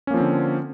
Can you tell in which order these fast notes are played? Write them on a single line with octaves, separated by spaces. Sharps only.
C#4 A#3 F3 C4 D3